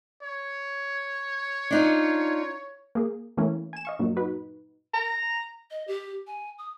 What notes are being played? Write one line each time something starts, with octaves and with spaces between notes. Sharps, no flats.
C#5
D4 D#4 F4
A#3 G#4
E3 A3 A#3 C#4 E4
G#5 E7
D#5 F5 C#6
G2 A#2 F#3 A#3
D#4 F#4 B4
A#5
D#5
G4
G#5
D#6